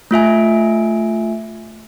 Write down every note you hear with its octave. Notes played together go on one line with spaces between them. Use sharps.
A3 F4 E5 G#5